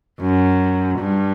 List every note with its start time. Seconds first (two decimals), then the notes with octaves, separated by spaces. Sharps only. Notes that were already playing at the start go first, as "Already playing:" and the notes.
0.21 F#2
0.99 G2